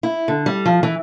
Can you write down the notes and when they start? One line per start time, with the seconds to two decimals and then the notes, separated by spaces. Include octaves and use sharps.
0.03 E4
0.28 D3
0.46 G3
0.66 F3
0.83 E3